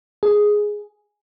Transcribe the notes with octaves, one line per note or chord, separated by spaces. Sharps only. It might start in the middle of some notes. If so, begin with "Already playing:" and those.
G#4